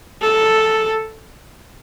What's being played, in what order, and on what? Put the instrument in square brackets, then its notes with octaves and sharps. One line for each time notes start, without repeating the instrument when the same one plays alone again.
[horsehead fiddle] A4